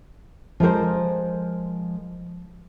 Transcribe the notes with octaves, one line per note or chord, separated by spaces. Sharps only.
F3 G#3 A#4 C5